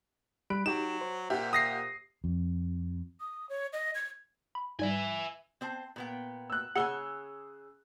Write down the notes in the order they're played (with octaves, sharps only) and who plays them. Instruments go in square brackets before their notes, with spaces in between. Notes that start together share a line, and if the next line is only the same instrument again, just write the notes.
[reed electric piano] G3 B5 F#6 [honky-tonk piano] D7
[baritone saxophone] F#3 [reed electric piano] D#4 G4 G5 [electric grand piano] E7
[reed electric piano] C5
[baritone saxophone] A#2 [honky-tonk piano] G4 E5 F#5
[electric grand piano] D#6 A#6 C7
[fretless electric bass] F2
[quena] D#6
C#5
D#5
G#6
[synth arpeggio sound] B5
[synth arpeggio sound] G#2 G3 [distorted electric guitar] E5 G#5
[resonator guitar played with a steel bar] C4 C5 A5
A#2 B3 G5
[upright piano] E6 F#6
[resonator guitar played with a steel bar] C#3 C#5 G#5 [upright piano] G#4 E6 G7 [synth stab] F#5